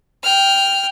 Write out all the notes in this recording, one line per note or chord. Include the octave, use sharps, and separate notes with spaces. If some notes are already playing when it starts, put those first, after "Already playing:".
G5 F6